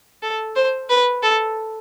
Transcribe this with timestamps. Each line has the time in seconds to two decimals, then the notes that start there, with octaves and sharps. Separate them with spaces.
0.22 A4
0.56 C5
0.90 B4
1.23 A4